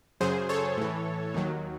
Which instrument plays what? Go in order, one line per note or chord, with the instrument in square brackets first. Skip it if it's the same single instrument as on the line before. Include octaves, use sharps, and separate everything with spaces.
[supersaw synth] F#2 C#3 F#3 G#4 C5
A4 C#5
A2 E3
D#2 D#3 F#3